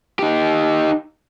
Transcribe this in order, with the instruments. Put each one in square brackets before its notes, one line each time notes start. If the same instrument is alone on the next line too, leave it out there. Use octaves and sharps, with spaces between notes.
[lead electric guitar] D#4 G4